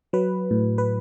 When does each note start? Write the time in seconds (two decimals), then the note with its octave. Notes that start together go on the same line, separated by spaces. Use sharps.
0.13 F#3 B4
0.51 A2
0.78 B4